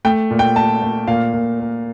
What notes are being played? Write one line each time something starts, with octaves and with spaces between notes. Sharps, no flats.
A3 G5
A#2
G5
A3 A5
A3
A#2 F5
A#2
A#3